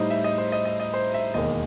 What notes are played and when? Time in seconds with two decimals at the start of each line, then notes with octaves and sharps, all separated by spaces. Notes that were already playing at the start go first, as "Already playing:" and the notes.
Already playing: A2 G3 D#4 C5 D#5
0.10 E5
0.24 D#5
0.38 C5
0.52 D#5
0.65 D#5
0.80 D#5
0.94 C5
1.14 E5
1.34 E1 D#2 D#3 D#5